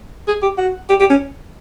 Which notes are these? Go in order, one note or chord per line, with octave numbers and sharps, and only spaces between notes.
G#4
G4
F#4
G4
G4
C#4